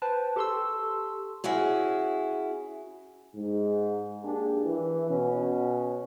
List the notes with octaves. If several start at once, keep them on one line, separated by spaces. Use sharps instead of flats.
B4 C5 G5 A5
G4 A4 A5 C6 C#6 E6
C#4 E4 F#4 G#4
G#2
A#3 D4 G4 G#4
E3
B2 C#4